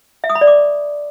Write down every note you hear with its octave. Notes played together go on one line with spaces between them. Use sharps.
E5
D#6
B5
D5
D6